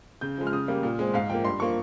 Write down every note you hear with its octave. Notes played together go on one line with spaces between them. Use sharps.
C#3 G6
F3 G#3
F6
C#3 D#6
G3 A#3
A#2
G#3 C4
G#2 F5
F3 A#3 G5
G2 C6
F3 A#3 C#6